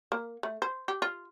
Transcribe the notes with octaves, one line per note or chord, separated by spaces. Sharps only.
A#3
A3
C5
G4
F4